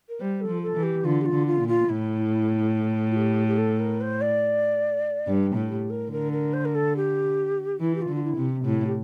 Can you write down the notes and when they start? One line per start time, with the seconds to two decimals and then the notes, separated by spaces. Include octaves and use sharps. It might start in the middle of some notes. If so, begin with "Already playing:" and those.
0.09 A#4
0.20 G3 C5
0.41 A4
0.48 F3
0.62 A4
0.76 E3
0.83 G4
1.04 D3 F4
1.21 G4
1.25 F4
1.32 D3
1.46 F4
1.61 A#2
1.68 F4
1.89 A2 E4
3.10 F4
3.16 G4
3.47 G4
3.57 A4
3.79 A#4
4.00 C5
4.21 D5
5.27 G2
5.55 A2
5.69 G4
5.90 A#4
6.11 D3 A#4
6.32 A#4
6.53 C5
6.65 A#4
6.74 A4
6.96 G4
7.80 E3 E4
7.95 G4
8.01 F4
8.09 D3
8.15 F4
8.23 E4
8.36 C3
8.64 A2 E4
8.86 G4